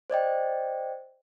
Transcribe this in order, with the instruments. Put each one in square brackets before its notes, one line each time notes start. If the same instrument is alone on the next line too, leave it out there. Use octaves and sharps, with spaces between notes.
[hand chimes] C5 D5 D#5 G5